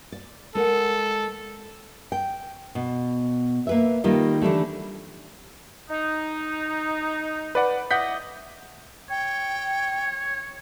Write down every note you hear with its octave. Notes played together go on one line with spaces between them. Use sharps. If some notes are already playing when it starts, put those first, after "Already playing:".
D5
G#3 A4 A#4 F#5
G5
B2
A#3 B4 E5
D#3 G3 A#3 D#4 F4
D3 E3 G3 A3
D#4
B4 D5 F#5
E4 D5 D#5 F#5 G6 B6
C#5 G5